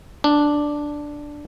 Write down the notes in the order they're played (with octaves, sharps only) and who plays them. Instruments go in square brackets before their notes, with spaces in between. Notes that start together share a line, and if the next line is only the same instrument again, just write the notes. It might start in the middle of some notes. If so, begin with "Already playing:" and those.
[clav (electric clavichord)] D4